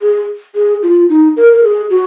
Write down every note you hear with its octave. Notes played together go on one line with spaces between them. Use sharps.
G#4
G#4
F4
D#4
A#4
A#4
G#4
F#4